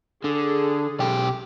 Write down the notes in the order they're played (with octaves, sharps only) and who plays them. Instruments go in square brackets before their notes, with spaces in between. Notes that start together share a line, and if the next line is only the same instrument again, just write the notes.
[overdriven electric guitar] D3 [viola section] G#4 A4
[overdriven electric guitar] B1 G4